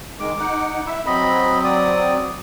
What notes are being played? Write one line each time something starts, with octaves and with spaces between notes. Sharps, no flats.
D#3 G#3 D6
D#4 F#5
E4 E5
F#3 C4 D#5 B5
D5 D#6